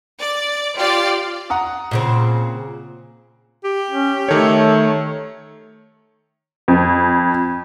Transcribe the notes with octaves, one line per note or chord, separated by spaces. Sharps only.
D5
F4 G4 D5
F#5 A#5 D#6
A#2 C#3 C4
G4
C#4
D#3 A3 A4 C#5
F2